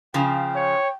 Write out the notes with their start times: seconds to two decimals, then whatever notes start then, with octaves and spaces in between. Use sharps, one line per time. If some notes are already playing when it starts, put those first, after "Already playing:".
0.14 C#3 F3 G5
0.56 C#5